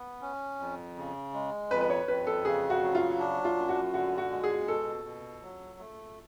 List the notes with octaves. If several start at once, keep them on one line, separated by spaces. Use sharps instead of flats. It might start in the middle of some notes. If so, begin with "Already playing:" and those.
Already playing: B3
C#4
F2
C#3
G#3
F2 B4
B4
C#5
F2 B4
A4
C#3 G#4
F#4
F#3
F4
D4
F4
F#2
F#4
D3 F#4
F#4
G#3
G#4
B2 A4
B2
F#3
A3